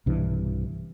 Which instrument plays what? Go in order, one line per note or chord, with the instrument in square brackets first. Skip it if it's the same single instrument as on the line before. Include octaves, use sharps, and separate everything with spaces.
[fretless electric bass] B1 G2 C3 E3